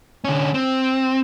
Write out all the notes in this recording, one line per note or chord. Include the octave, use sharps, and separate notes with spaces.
D3 C#4
C4